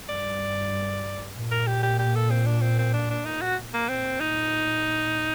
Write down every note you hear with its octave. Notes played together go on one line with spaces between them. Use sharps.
G2 D5
A#2
A#4
G4
G4
G4
A4
C4
D4
C4
C4
D4
D4
D#4
F#4
A#3
A#2 C4
D#4